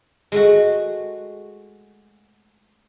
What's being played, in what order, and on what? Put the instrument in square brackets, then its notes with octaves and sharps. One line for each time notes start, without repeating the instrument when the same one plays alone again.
[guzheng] G#3 A3 F#4